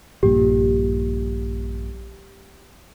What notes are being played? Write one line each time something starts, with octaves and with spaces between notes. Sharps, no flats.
A#1 G2 A#2 G4